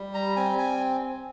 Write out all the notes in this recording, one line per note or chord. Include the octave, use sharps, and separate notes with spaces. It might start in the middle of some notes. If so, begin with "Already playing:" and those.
Already playing: G3
A#5
C4 G#5
G#5